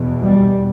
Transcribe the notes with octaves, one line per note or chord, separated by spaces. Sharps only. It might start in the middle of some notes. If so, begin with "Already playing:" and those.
Already playing: E2 B2
G3